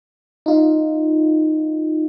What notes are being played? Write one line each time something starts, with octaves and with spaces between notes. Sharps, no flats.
D#4 F4